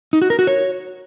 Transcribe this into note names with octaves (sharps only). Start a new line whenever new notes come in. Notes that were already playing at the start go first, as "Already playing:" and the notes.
D#4
F#4
A#4
F#4
C#5